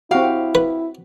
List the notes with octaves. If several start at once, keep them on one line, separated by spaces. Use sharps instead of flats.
C4 E4 F#4 G4 F5
B4